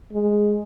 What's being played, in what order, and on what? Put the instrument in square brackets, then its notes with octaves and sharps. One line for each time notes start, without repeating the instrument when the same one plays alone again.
[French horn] G#3